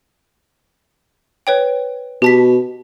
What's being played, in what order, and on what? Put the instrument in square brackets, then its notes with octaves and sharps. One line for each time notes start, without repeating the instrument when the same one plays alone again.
[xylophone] B4 C#5 G5
[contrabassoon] B2 [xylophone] G4 A5 B6